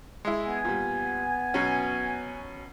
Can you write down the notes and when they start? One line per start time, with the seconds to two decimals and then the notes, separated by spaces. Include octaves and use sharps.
0.25 G#3 E4
0.46 B3 G#5
0.65 A#2 G3
1.54 B2 F#3 C#4